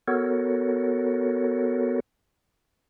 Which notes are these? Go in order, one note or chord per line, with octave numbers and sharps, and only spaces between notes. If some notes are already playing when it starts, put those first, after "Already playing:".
B3 F#4 A4 A#4 C#5